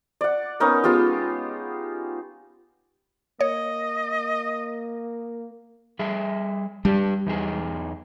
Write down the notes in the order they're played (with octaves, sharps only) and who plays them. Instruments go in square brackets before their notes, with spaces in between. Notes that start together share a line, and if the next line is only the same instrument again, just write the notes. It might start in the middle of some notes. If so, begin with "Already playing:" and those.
[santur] D5 F#5
B3 C#4 D#4 A#4
G#3 B3 F4 G4
[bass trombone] A#3 [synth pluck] C#5 [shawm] D#5
[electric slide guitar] G3 G#4 E5
[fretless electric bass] G3 [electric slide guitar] D4 G4
[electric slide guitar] E2 D#4 G#4